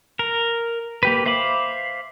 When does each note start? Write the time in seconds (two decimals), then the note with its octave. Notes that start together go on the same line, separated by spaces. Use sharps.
0.19 A#4
1.03 A#3 G4 B4
1.26 C5 E5 F5 B5 D6